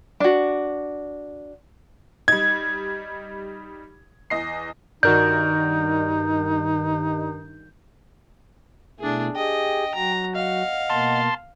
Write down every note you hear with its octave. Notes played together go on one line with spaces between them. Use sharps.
D4 F#4
G3 D#4 G#6
E2 D#5 C7
G2 D#3 D#4 F#4 A#4 D5 G6
B2 A3 D4 E4 G#4
G4 G#4 D#5 G5
F#3 F#4 A#5
D#5 F5 F#5
B2 A#3 A5 C6